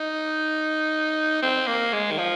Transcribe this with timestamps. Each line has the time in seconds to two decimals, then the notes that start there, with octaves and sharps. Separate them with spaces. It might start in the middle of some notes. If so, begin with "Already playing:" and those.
Already playing: D#4
1.42 C4
1.67 A#3
1.93 G#3
2.11 D#3
2.18 F3